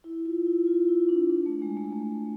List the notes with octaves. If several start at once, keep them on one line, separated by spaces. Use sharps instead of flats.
E4
F4
E4
F4
E4
D4
D4
A3
G#3
A3
A3